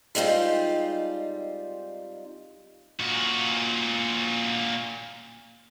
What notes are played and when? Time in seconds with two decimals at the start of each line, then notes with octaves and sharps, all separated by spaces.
0.15 G3 G#3 C4 D#4 F4
3.00 A#2 F#4